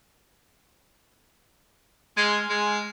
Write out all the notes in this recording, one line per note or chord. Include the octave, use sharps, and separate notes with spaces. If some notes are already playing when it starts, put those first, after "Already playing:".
G#3 G#5 C6 F6
G#3